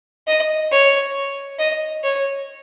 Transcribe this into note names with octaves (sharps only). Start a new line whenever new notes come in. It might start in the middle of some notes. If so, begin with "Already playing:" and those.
D#5
C#5
D#5
C#5